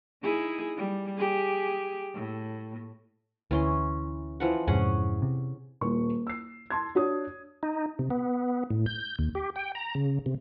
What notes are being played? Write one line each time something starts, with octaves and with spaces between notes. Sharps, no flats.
D#4 E4 G#4
G3
G4 G#4
A2
D2 E3 C#4 C6
E3 F3 F#5
F2 G#2 C3 C#4 G#4 F#5
C3
D#1 C#6
E6 C7
A5 C6 G#6
D4 F#4 C#5 D#6
D#4
C3
B3
A2
G6
D#2
G4
G5
A#5
C#3
C3